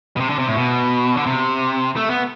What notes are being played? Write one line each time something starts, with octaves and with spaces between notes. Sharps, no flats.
B2
C3
D3
C3
A2
B2
D3
C3
A3
B3